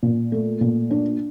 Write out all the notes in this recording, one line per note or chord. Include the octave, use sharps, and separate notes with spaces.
A#2
A3
A#2
D4